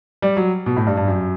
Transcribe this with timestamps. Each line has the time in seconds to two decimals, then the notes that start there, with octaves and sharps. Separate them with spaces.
0.22 G3
0.37 F#3
0.66 B2
0.77 A2
0.87 G2
0.97 G2
1.08 F#2